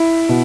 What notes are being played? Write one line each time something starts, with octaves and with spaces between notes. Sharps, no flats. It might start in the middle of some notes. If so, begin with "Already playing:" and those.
Already playing: E4
B2